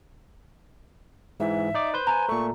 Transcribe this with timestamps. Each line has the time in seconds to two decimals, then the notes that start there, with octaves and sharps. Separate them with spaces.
1.40 G#2 E3 E5
1.74 D#4 D5 D6
1.94 B4 C5 G6
2.07 G#5 A#5
2.29 A#2 A3 C#6